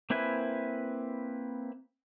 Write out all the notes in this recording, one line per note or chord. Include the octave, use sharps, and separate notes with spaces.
A#3 C4 E4 B4 G#5